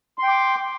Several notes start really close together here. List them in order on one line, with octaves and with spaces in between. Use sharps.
C6 G5 D6